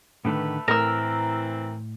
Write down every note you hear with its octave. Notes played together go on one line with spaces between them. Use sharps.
A2 D3 D#3 A3 B4
A2 E3 C4 A#4 E6